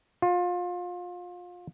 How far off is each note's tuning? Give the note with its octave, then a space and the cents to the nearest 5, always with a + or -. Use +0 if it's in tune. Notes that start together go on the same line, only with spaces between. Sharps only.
F4 +25